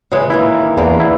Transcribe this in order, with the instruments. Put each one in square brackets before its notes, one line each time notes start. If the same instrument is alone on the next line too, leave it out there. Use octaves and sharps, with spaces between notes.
[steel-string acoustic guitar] C#3 E3 G#3
[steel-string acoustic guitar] D#3 E3 A#3 [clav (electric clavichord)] E4
[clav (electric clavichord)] E2 [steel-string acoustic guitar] D3 A#3
[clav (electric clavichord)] E4